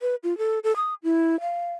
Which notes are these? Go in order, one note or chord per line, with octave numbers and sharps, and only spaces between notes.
B4
F4
A4
A4
D#6
E4
F5